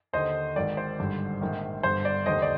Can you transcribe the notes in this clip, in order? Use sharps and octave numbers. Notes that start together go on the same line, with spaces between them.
D#2 D3 C5 D#5
G#1 G#2 D#3 D5
C5
G#1 G2 D3
A#1 G#2 D#3
G1 G2 D3 C5
D5
F1 D#2 D3 C5 D#5
D5